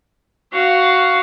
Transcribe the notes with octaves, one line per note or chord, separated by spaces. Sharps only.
F#4 F5